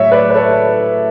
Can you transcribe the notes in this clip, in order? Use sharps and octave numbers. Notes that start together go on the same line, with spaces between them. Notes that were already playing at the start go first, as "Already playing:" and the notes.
Already playing: A2 F#3 C#5 E5
B4 D5
B4
A4 C#5